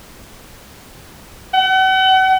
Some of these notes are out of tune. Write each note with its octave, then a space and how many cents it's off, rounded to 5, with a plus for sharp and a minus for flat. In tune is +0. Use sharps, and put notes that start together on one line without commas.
F#5 +40